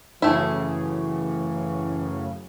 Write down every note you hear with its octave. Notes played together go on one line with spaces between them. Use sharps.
F#2 A2 C#3 E3 A3 E4